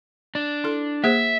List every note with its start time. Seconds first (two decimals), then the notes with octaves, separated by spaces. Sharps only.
0.35 D4
0.64 E4 A4
1.04 A#3 G#4 C5 E5